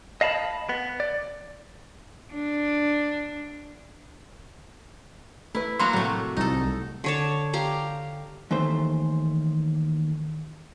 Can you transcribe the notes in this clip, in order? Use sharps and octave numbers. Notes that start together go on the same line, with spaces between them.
D#5 F5 A5 B5
B3
D5
D4
A3 E4 B4
F#3 A#3 F#4 B5 C6
A2 C3 F#3 A3
C2 D#4 A4
D3 C#5 A5
G4 F5 A#5
D#2 E3 A3 C5